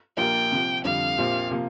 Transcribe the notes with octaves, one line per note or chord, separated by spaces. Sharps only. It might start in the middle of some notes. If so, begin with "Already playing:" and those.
A#1 A#2 A#3 G4 A#4 G5
C2 C3 F3
F2 D3 G3 F5
A#1 A#2 F3 C4 G4
C3 F3 A#3